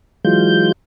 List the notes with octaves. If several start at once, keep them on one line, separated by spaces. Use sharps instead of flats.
E3 F#3 G#3 F4 G6